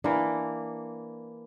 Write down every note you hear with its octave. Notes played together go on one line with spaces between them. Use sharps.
E3 A#3 D4